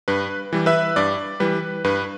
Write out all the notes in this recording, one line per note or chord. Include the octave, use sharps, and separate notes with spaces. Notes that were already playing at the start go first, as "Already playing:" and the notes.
G2 B4
E3 G3
B4 E5
G2 D5
E3 G3 B4
G2 B4